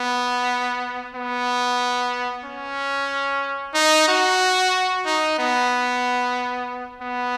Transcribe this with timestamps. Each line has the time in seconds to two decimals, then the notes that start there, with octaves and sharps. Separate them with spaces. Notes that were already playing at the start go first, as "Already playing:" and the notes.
Already playing: B3
1.15 B3
2.45 C#4
3.75 D#4
4.08 F#4
5.06 D#4
5.39 B3
7.02 B3